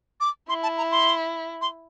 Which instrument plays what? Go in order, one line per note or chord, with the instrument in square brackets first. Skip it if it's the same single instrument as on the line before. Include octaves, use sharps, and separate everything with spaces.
[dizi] D6
[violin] E4 [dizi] C6
[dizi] A5
A#5
C6
C6